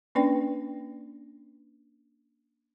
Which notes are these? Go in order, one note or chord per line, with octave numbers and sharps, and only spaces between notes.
A#3 C#4 D4 B4 D5 G5